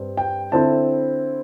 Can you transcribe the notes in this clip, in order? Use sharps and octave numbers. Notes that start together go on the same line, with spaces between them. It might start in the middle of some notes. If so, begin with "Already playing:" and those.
Already playing: G2 G3 C4
G5
D3 C4 E4 A5